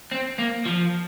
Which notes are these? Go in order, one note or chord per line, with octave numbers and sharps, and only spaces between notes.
C4
A#3
F3